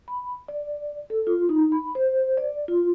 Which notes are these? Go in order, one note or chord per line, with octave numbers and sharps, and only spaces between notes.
B5
D5
A4
F4
D#4
B5
C5
D5
F4